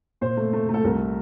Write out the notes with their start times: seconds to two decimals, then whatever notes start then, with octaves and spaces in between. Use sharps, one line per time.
0.21 A#2 C5
0.37 A3
0.53 A3
0.69 A3 A4
0.84 C2 A#4